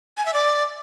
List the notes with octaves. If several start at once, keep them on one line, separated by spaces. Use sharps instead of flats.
G#5
E5
D5